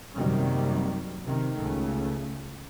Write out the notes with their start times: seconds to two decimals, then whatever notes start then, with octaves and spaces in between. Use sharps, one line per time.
0.16 F#2 C3 D#3 F#3 G3 A#3
1.26 C3 D#3
1.59 C#2 C#3 A3